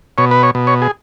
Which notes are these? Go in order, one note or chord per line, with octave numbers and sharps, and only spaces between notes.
B2 C#5
B4
C#5
B2
C#5
G#4